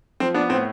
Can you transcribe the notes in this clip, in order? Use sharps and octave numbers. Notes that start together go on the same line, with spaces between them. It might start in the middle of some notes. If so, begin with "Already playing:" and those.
F3 C4
B3 D4
A2 C4